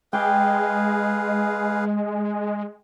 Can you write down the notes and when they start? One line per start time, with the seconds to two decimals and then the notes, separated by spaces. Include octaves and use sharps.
0.13 G#3 G#4 B4 F5 G5 D6